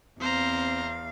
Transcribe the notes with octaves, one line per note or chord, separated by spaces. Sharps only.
E2 C4 C5 F5 A#5